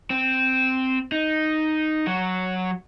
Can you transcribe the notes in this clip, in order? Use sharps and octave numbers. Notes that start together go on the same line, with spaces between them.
C4
D#4
F#3 F#4